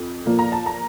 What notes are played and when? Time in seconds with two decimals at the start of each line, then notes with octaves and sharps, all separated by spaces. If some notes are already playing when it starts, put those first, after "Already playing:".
Already playing: F2
0.26 A#2 F3 A#3
0.39 A#5
0.52 A5
0.66 A#5